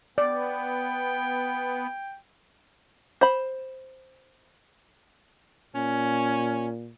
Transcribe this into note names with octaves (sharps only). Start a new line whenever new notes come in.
B3 D5 G5
C5 B5
A#2 C#4